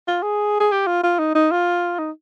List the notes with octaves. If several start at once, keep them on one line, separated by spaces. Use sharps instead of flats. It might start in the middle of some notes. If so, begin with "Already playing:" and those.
F4
G#4
G#4
G4
F4
F4
D#4
D#4
F4
D#4